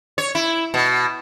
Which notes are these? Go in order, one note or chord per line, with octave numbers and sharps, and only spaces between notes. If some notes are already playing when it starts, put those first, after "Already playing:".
C#5
E4
B2